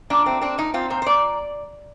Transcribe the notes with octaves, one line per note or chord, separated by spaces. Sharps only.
A#2 D4
A3 C4
C4 D4
A#2 D#4
C4 F4
A#2 C5
C5
A#2 D5